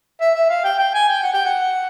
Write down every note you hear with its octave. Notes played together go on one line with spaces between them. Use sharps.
E5
E5
F5
G5
G5
G#5
G5
F#5
G5
F#5